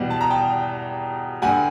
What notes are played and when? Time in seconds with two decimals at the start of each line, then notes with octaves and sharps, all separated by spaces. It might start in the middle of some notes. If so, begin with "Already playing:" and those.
Already playing: E2 B2 G3 F#5
0.10 A5
0.21 A#5
0.30 G5 A5
1.42 G2 D3 G3 F#5 G#5